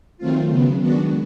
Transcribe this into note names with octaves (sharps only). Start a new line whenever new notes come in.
D#3 F#3 A3 C4 F4
C#3 F#3 B3
D#3 G#3 B3 D4 F#4